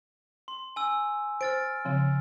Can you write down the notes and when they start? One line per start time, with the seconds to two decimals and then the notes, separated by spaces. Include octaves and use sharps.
0.48 C6
0.76 G#5 E6
1.41 C5 F6 A6 D7
1.85 C#3 F3 C4